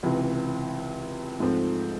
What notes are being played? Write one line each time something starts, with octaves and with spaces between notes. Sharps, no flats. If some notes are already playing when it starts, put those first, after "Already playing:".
C#2 C3 E3
G#2 F3 A3 C4